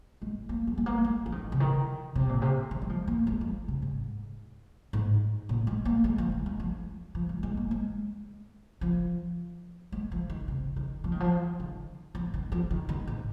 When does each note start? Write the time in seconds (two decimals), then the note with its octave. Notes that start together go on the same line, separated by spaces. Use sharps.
0.22 G#3
0.49 A#3
0.67 A#3
0.78 G#3
0.86 A#3
1.05 G#3
1.26 F3
1.32 D#3
1.52 C3
1.60 D#3
2.15 C3
2.29 A#2
2.42 C3
2.71 D#3
2.82 G#3
2.89 F3
3.08 A#3
3.27 G#3
3.41 F3
3.68 C3
3.82 G#2
4.93 G#2
5.49 A#2
5.67 G#3
5.85 A#3
6.04 G#3
6.18 F3
6.32 G#3
6.46 G#3
6.60 F3
7.15 F3
7.29 G#3
7.43 G#3
7.57 A#3
7.71 G#3
8.81 F3
9.92 G#3
10.12 F3
10.30 D#3
10.48 C3
10.76 D#3
11.04 F3
11.12 D#3
11.20 F3
11.60 D#3
12.15 F3
12.34 D#3
12.52 F3
12.71 D#3
12.89 D#3
13.07 G#2